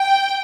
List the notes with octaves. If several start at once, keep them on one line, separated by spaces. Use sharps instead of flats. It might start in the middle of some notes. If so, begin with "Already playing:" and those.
Already playing: G5